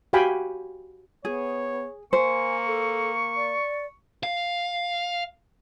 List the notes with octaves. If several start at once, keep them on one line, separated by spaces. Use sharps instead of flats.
F#4 G4 F5 G5 G#5 B5
B3 G#4 C#5
A#3 C5 G#5 C#6
A4
D5
F5